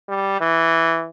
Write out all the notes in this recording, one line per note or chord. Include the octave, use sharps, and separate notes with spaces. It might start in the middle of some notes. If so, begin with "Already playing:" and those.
G3
E3